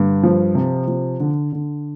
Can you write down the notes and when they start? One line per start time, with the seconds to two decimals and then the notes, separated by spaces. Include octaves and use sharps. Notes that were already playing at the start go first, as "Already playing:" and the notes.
Already playing: G2 D3
0.23 F3
0.55 C3
0.88 F3
1.20 D3
1.53 D3